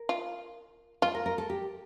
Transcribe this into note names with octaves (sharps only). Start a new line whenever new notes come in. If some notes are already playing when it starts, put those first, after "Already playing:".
Already playing: A#4
F4
F4 A4
A#4
A#4
A4
G4